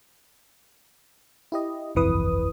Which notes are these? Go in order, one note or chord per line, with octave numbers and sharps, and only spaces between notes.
E4 G4 D#5
G1 C2 F2 E3 B4 D#6